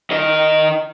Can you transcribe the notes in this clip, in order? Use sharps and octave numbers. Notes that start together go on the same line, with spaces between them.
D#3 D#5